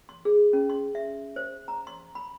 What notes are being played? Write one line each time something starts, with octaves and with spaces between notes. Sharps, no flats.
C6
G#4
C#4
C6
E5
C5
A#5
C6
B5